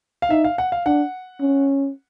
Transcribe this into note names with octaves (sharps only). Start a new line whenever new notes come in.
F5
D#4 E5
F5
F#5
F5
D4 F#5
C#4